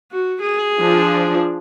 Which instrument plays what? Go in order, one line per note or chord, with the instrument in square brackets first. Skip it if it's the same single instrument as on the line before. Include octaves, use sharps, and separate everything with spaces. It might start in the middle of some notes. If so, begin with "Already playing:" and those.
[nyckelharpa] F#4
G#4
[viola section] F3 D4